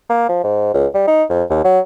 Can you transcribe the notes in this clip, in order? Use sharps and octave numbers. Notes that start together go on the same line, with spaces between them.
A#3
F3
G#2
C#2
G3
D#4
F2
D#2
F#3